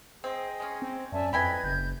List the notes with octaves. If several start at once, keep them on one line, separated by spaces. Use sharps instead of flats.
C4 G#4 D#5 G5
G#3 C#4
C4
F#2 D5 E5 G#5 A5
F2 E4 B4 D#5 G5 G#5 G#6 B6
F#1 G6